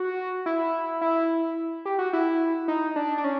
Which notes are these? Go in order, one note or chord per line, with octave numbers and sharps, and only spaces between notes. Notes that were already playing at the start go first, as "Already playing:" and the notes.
Already playing: F#4
E4
E4
G4
F#4
E4
D#4
D4
D4
C#4